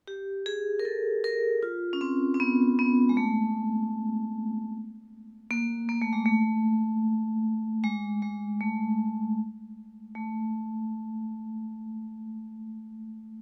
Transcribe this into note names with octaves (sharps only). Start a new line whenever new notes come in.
G4
G#4
A#4
A4
A#4
F4
C#4
C4
C4
B3
B3
G#3
A3
A#3
A#3
A3
G#3
A3
G#3
G#3
A3
A3